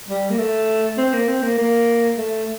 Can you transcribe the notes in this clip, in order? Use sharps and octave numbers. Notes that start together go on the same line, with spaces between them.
G3
A#3
A3
C4
A#3
C4
A#3
A#3
A3